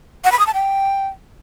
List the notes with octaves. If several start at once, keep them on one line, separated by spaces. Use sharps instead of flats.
F#5
B5
D#6
A5
G5